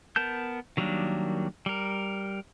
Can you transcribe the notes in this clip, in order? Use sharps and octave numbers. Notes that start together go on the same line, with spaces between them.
B3 A#4 A5 G6
D#3 F#3 G3 A#3 D4
G3 A#4